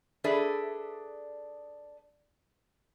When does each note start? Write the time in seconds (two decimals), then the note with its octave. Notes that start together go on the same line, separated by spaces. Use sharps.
0.24 D4 G#4 A4 B4 D5 E5